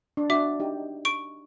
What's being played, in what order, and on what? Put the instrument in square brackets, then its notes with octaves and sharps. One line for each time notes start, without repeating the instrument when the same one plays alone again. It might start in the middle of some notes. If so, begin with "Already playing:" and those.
[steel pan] D4
[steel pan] D4 F#4 [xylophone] E5 D6
[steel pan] D#4 G4
[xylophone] C#6 D7